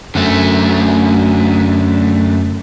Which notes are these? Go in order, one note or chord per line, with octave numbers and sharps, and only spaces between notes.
F#2 D3 A3